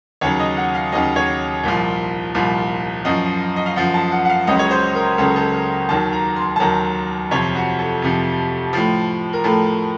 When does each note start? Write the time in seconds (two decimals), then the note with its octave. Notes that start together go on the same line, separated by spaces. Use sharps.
0.21 D#2 C#3 F#3 C#5
0.39 D#5
0.57 F#5
0.75 F5
0.92 D#2 C#3 F#3 D#5
1.16 C#5
1.63 C2 A#2 F3
2.34 C2 A#2 F3
3.05 F#2 F3 D#5
3.56 D#5
3.66 F5
3.76 F#2 F3 F#5
3.94 A5
4.12 F#5
4.25 F#5
4.30 F5
4.47 C#2 C#3 F#3 D#5
4.59 C#5
4.71 C5
4.95 A#4
5.18 C#2 C#3 F#3 A4
5.36 A4
5.54 A#4
5.89 D#2 D#3 F#3 A5
6.13 A#5
6.36 C6
6.56 A5
6.60 D#2 D#3 F#3 A#5
7.31 F2 C3 F3 C#5
7.55 F#4
7.79 A4
8.02 F2 C3 F3
8.73 A2 F3
9.33 A#4
9.44 A2 F3 A4